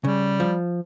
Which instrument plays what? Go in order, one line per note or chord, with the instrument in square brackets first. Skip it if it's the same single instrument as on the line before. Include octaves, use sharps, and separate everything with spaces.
[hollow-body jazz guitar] C#3 [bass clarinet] G3
[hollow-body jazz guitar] F3